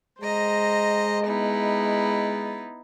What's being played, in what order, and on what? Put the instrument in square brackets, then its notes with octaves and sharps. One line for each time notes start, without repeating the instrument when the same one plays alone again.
[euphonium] G#3 [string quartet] C5 D#5 A#5
[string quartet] B3 D#4 E4